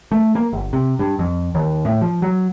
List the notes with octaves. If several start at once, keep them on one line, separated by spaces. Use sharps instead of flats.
A3
A#3
G1
C3
G2
F2
D#2
A2
F3
F#3